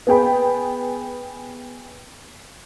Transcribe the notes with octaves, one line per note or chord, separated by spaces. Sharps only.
B3 G#4 G5 B5